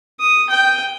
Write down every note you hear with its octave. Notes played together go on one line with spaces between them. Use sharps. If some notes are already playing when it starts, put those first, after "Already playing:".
D#6
G5